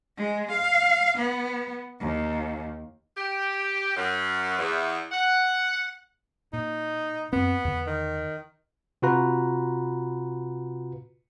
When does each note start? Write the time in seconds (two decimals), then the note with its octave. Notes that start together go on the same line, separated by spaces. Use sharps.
0.17 G#3
0.52 F5
1.18 B3
2.01 D#2
3.17 G4
3.96 F#2
4.58 E2
5.12 F#5
6.53 A#2 D#4
7.33 F#2 B3 C4
7.65 E2 D3
7.87 D#3
9.02 C3 F4 F#4 B4 A#5